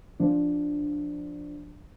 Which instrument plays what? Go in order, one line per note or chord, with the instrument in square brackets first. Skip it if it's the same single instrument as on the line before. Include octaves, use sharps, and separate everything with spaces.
[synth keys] F3 D4